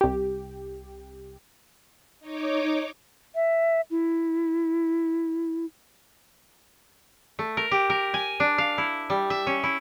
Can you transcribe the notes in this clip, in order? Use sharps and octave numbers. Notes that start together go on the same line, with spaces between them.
C2 G4
D#4 C#5 D6
E5
E4
A3
A#4
G4
A#4
G#5
D4
F5
E4
G3
E5
C#4
E4